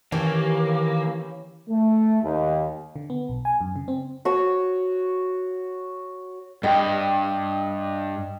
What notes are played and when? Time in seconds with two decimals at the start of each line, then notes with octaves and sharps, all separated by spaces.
0.12 D#3 E3 A#3 C#4 G4
1.69 A3
2.23 D#2
2.96 D3
3.10 B3
3.29 B1
3.45 G#5
3.61 F#2
3.76 C#3
3.88 C4
4.25 F#4 C#5
6.63 G2 D#5 G5